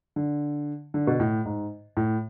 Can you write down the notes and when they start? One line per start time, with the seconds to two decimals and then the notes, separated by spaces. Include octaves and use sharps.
0.16 D3
0.94 D3
1.07 B2
1.20 A2
1.45 G#2
1.97 A2